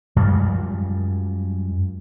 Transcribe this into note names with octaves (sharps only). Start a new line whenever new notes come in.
F#2 F3 G3 G#3